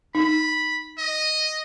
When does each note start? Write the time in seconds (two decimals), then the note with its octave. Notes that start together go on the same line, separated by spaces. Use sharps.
0.15 D#4 B5
0.98 D#5